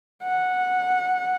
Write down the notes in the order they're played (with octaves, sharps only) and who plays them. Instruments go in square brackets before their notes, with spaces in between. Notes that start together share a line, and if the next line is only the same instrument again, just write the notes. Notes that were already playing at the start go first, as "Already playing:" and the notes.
[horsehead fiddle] F#5